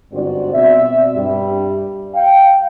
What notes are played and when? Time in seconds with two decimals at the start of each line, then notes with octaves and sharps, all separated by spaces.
0.11 G1 G#2 C4 F#4 D5
0.53 B2 C4 D5 E5
1.16 G2 G3
2.15 F5 G5